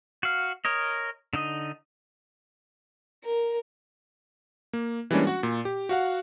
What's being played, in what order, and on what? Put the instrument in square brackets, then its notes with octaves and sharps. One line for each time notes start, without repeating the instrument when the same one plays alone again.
[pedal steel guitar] F#4 F5
A#4 C#5 D#5
D3 D#4 D#5
[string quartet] A#4
[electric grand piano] A#3
E3 G3 G#3 A#3 C#4 D4
F#4 F#5
A#2
G4
F#4 F5 F#5